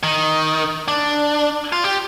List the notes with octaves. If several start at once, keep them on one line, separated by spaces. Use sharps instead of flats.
D#3
D4
F4
G4